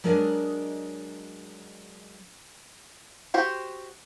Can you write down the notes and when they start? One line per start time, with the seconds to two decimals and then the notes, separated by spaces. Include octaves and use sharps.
0.04 F#3 G#3 D4 A#4 D5 D#5
3.34 F#4 G4 C5